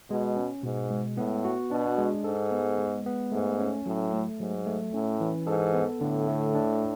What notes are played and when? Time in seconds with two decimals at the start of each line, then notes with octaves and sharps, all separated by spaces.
0.11 B2 G#3
0.37 C#4
0.63 G#2 B2
0.91 G#3
1.17 A2 B3
1.45 F#4
1.71 B2 D4
1.98 G#3
2.24 G#2 A4
2.51 B3
2.78 G#3
3.06 B3
3.32 G#2 A3
3.59 C#4
3.86 A2 F#3
4.13 A3
4.40 G#2 F#3
4.66 A3
4.93 A2 C#4
5.21 E3
5.47 G#2 A4
5.74 B3
6.01 A2 D3
6.28 A3
6.55 D4